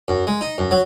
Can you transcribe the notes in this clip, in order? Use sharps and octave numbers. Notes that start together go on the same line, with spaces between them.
F#2
G#3
D#4
F#2
F#3